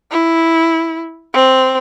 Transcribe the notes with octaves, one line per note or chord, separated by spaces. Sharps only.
E4
C4